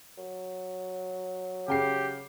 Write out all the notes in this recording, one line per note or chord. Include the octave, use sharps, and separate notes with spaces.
F#3
C#3 G4 G5 C7